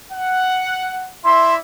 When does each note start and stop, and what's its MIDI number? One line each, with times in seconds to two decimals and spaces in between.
0.12 1.12 78
1.25 1.58 64
1.25 1.58 74
1.25 1.58 76
1.25 1.54 84